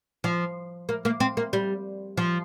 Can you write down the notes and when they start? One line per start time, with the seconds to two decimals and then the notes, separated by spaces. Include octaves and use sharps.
0.24 F3
0.89 A#3
1.05 A#3
1.20 C4
1.37 A#3
1.53 G3
2.17 F3